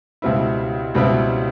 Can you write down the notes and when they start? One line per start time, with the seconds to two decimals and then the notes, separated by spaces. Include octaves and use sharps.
0.22 C#2 B2 G3 C4 E4
0.94 C#2 B2 G3 C4 E4